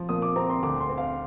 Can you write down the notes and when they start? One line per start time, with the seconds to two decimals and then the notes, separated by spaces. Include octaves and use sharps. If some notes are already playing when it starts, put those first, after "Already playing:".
Already playing: F3
0.09 A#2 D#6
0.22 D6
0.36 C4 A#5
0.50 C6
0.62 D2 D6
0.81 C6
0.89 C4
0.98 F5